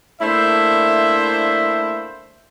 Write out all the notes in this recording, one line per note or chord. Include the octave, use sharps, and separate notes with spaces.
A3 A#3 D4 E4 C5 E5